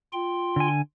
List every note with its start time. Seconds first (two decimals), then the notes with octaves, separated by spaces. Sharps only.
0.13 F4 G5 C6
0.56 D3 G#5